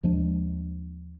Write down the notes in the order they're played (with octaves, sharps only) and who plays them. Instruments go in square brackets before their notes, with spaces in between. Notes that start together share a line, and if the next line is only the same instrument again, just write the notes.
[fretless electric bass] D#2 F3 G#3 D4